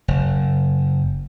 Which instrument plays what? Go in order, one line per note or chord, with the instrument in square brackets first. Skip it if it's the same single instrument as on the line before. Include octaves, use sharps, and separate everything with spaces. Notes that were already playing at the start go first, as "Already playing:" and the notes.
[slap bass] F#1